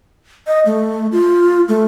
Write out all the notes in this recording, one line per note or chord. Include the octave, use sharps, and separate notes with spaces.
D#5
A3
F4
A3